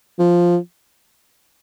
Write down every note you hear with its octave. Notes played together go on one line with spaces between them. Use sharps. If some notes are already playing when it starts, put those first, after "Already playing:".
F3